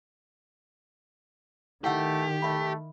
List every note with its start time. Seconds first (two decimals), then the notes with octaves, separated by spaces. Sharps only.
1.84 D#3 A3 E4 G4 F#5 E6
2.42 A3 E5 B5